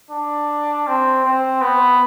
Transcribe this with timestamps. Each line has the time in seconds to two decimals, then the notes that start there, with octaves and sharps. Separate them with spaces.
0.11 D4
0.87 C4
1.25 C4
1.62 B3